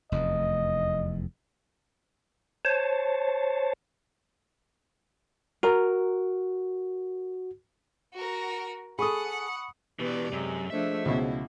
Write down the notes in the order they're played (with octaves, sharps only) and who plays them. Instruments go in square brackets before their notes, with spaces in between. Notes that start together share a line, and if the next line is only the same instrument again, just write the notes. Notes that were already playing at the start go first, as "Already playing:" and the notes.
[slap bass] F1 E2 [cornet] D#5
[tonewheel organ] C5 C#5 A5
[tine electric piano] F#4 [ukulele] A#4 A#5
[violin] F#4 A#4
[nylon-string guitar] G#4 A4 [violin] F#5 [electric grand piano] B5 C#6 D#6
[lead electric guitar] B2 E3 [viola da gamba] B3 B4 D5 [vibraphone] G4
[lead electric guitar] F#2 [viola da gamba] C3 G#3
[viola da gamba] F3 A3 D4 [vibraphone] G#4 C5 D#5 [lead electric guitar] E5
[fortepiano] C#2 B2 [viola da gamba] E4